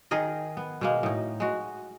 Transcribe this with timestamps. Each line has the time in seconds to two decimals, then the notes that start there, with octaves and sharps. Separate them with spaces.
0.11 D#3 G#4 A#4 D#5
0.57 B3
0.81 B2 G#3 A#3
1.03 A2 D#4
1.40 G#3 F#4